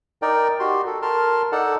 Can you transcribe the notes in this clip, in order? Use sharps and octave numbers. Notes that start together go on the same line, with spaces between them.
D#4 A#4 D5 G5
F#4 G4 C6
A4
A#4 A5 C6 F6
D#4 A4 D5 F#5 A5